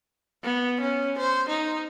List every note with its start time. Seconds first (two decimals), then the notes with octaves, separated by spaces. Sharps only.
0.44 B3
0.81 C#4
1.18 C5
1.49 D#4